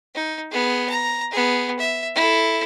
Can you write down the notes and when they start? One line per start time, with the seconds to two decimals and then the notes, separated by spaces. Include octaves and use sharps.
0.15 D#4
0.51 B3 G#4
0.89 A#5
1.31 B3 G#4
1.79 E5
2.15 E4 A4